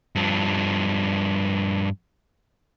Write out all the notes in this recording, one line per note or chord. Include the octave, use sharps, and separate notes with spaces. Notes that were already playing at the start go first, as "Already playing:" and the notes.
G2 F3